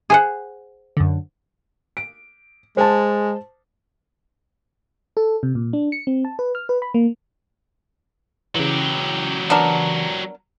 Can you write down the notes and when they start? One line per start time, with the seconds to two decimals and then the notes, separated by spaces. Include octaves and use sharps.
0.10 G#4 C5 F#5
0.97 F#2 D3
1.97 D7
2.77 G#3 C5 A5
5.17 A4
5.43 C3
5.55 A#2
5.73 D4
5.92 C#7
6.07 C4
6.25 A5
6.39 B4
6.55 F6
6.69 B4
6.82 B5
6.94 A#3
8.55 C#3 E3 F#3 G4
9.50 B3 D4 A#4